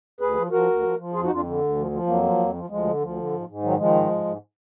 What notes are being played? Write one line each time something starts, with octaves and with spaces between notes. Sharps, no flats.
D2 G#4 B4
F3
F3 F#4 A#4
D2
F3
F3
F2 F4 G#4
D#4 F#4
F2
D4 F4
D3
D2
F3
F3
F2 F#3 A#3
F3
F2
F3
D2 F3 G#3
D3
D2 F3
D3
G#2
G#2
D#3 F#3
D#3 F3 G#3
G#2
G#2
G#2